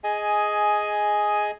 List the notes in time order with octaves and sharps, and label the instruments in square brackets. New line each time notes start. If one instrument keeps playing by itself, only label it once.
[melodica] G#4 D#5 G#5